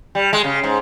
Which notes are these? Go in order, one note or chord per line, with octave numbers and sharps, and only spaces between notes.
G3
G#3
C#3
G#2